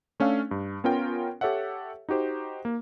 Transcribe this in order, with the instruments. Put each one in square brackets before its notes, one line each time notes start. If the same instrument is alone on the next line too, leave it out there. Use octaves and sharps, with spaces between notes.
[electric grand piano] A3 C#4 D4 F5 E6
G2
B3 C#4 F4 A#4 G5
G4 A4 C#5 E5 F#5
D#4 F#4 G4 C5
A#3